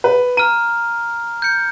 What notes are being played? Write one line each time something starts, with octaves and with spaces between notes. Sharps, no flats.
B4
A#5 F6 D#7
G6 C#7